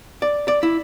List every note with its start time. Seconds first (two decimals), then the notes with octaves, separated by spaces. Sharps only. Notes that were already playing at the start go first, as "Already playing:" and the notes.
0.22 D5
0.48 D5
0.63 E4